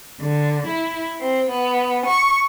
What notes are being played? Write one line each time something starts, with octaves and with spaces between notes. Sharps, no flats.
D3
E4
C4
B3
C#6